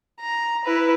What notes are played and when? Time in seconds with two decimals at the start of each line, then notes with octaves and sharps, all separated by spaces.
0.20 A#5
0.65 E4 B4